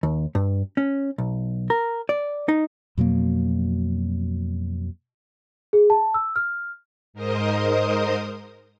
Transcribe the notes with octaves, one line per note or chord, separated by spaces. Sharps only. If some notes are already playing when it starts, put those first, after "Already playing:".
D#2
G2
C#4
B1
A#4
D5
D#4
F2 B2 F#3 A#3
G#4
A5
E6
F6
G#2 A#4 C5 D#5 D#6